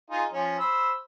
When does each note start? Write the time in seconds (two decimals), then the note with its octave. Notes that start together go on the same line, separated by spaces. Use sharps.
0.10 D#4 F4 G#4
0.33 F3 C#4
0.59 C5 B5 E6